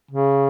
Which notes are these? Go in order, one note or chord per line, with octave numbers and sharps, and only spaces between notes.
C#3